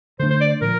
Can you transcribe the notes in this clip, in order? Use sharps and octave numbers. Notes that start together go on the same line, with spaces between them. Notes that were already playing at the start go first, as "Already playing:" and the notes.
D3 A3 D4 C5
C5
D5
A#2 F3 A#4